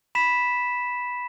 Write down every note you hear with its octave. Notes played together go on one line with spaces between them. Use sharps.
B5 B6 E7